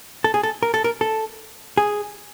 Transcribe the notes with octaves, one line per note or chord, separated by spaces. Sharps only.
A4
G#4
A4
A#4
A4
A#4
A4
G#4